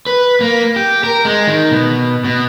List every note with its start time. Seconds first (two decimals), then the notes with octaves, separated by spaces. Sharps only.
0.06 B4
0.41 A#3
0.76 G4
1.04 A#4
1.25 G#3
1.47 D#3
1.71 B2
2.24 B2